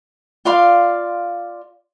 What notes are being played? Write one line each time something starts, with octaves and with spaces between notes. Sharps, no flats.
F4 D5 F5 C6